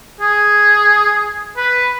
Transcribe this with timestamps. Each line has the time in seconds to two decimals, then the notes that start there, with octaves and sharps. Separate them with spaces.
0.21 G#4
1.56 B4